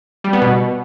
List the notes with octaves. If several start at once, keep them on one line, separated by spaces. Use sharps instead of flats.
G3
B3
B2